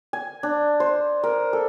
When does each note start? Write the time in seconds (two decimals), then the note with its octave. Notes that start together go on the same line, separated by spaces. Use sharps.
0.13 G#5
0.43 D4
0.80 C5
1.24 A#4
1.53 A4